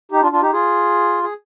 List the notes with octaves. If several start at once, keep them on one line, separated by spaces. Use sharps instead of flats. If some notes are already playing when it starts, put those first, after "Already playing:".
D#4 G4
D4 F4
D4 F4
D#4 G4
F4 G#4
G#4